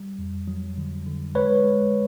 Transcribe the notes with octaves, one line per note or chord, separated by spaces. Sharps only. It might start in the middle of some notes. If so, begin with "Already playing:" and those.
Already playing: G3
F2
F#3
D3
D3
G#3 B4 C#5
G#3